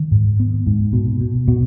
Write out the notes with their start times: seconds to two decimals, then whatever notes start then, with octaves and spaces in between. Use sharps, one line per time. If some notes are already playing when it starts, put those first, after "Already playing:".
Already playing: D#3
0.11 G#2
0.40 B3
0.67 G#2
0.93 B2
1.21 B2
1.48 B2